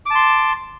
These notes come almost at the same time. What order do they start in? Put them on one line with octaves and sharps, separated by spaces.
D6 A5 C6